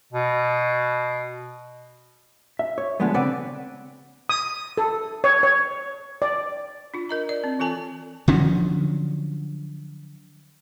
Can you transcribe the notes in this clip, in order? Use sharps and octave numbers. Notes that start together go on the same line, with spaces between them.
B2
E5
C#5
D3 F3 G#3 A3 B3
C#3 C4 B4 D5 F#5
D#6
A4
C#5
C#5
D5
D4 F4
A#4 D#5 A#5
D5
C4
E3 F4 A4 G#5 A5
D3 F3 F#3 C#4